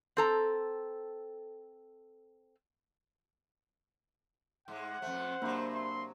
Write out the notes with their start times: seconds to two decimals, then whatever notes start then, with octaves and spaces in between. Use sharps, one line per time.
0.17 C4 A4 A#5
4.68 G#2 G#3 F#5
5.02 F2 A3 C5
5.42 C3 F#3 A#3 D4 B5
5.74 C6